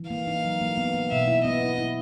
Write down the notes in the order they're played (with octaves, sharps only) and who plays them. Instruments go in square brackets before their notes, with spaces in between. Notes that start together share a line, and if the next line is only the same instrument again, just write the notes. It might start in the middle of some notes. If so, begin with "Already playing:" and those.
Already playing: [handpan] E3
[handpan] A#3 [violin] F5
[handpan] D#4
F#3
A#3
B3
B3
[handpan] B2 [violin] E5
[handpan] E4
[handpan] B3 [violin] D#5
[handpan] E4
E4